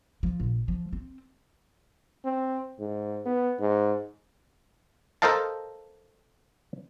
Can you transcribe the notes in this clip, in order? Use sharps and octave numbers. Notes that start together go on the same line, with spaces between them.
F3
A#1
F3
C4
C4
G#2
B3
G#2
A4 A#4 C5 D#5 F5 A5